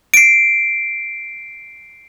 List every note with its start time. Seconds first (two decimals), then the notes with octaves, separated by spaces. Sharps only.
0.14 C7 D7